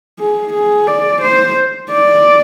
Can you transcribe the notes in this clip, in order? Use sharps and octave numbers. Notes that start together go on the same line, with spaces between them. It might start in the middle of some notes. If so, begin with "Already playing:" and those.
G#4
G#4
D5
C5
D5